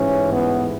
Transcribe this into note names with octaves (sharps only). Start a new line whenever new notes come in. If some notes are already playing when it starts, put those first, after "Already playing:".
Already playing: A1 G#2 E3 C#4
B3